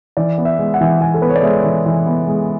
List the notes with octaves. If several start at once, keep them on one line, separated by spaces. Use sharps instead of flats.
E3 D5
B3
E5
G#3
F#5
E3
E3 G#5
A4
B3 B4
C#5
D5
G#3 E5
E3
E3
B3
G#3